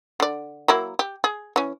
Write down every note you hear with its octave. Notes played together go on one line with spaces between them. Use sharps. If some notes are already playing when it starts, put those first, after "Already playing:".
D3 D5
F#3 A#3 E4
G4
G#4
E3 C#4